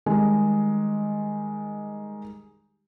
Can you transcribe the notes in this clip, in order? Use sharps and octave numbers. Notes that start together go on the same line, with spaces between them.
D#3 G3 G#3